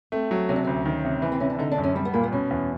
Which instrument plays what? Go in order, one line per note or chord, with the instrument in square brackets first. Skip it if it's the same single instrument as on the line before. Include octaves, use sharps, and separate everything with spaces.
[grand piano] A3 [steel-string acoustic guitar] C4
[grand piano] F#3
[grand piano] C3 [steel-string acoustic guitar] C#4
[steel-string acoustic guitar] D4
[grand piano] D2 [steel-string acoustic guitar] C#4
[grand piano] D#3
C3
[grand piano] E3 [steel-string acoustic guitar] C#4
[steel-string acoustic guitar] C4
[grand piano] C3 [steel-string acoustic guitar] C#4
[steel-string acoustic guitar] D4
[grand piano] D3 [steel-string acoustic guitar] D#4
[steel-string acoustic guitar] D4
[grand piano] F#2
[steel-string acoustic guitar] C#4
[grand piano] G3 [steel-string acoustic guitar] C4
[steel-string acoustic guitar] B3
[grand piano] A#2 [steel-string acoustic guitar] A#3
[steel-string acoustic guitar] B3
[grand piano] B2 [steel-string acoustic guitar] C#4
[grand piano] E2